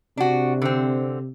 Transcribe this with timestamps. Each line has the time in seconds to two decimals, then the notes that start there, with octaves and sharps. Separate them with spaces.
0.17 C3 D4 F#4
0.62 D3 C4